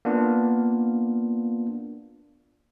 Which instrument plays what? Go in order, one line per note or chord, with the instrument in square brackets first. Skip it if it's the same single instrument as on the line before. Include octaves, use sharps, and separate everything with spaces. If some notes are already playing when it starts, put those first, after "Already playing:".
[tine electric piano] A#3 B3 D4 F4